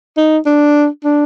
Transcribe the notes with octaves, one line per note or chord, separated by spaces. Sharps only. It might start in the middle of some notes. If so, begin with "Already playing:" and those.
D#4
D4
D4